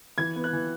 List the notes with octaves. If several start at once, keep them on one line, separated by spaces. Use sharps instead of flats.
E3 G#6
B3
F#6
E3